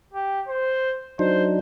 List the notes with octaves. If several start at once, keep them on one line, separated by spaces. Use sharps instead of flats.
G4
C5
F#3 D4 D#4 C5